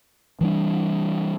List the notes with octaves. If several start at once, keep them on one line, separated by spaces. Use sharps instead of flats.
E3 G3 D4